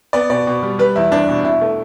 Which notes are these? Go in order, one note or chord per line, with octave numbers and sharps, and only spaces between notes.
B3 D5
B2 D5
B2
G3
G3 B4
E2 E4
E2 D4
B2
B2 E4
A3